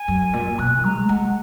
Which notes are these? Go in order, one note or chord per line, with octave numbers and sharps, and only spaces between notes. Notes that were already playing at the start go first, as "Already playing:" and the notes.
Already playing: G#5
F#2
A#2
B2 F#6
G#3 A#5
G#3 F#5